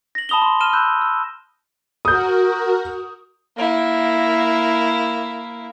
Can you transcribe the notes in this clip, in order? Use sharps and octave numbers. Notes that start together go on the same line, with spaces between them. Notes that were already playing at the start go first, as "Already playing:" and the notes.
A#6 F#7
A5 B5 D#6 F7 G7
C6
F6 D#7 E7 G7
B5 E6 F#6 G6
E6
F#4 A#4 D#6 G6
A#3 E4